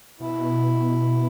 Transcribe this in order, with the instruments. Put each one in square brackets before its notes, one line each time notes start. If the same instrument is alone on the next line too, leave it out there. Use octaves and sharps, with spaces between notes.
[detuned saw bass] B2 [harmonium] E4